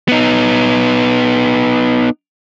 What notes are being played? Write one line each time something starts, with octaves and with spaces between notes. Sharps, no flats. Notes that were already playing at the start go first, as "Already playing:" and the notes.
B3 D#4